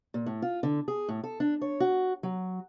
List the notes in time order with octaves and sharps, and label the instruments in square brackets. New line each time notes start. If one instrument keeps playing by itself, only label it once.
[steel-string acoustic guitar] A#2
A2
F4
D3
G#4
A2
A4
D4
C#5
F#4
F#3